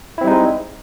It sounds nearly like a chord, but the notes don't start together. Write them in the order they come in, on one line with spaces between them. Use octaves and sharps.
E4 C4 G3 D#4 G#3